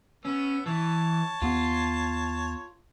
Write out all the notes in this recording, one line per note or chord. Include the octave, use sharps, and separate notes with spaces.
B3 C#4 E6
E3 C#5 A5
D#2 B3 F4